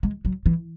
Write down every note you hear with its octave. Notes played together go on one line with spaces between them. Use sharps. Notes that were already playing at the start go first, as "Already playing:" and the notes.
G#3
F#3
E3